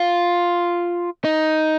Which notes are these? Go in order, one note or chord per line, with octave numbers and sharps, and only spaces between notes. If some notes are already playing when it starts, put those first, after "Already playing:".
Already playing: F4
D#4